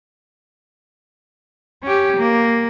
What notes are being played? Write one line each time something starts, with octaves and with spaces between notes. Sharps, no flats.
C#4 G4
A#3